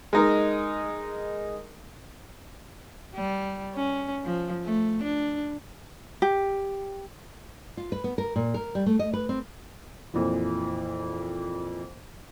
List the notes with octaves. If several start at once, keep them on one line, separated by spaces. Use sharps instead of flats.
G#3 D#4 A#4
G3
C#4
F3
A3
D4
G4
F4
B4
B3
A#4
A#2
A#4
G3
A3
D#5
B4
C4
F2 A#2 E3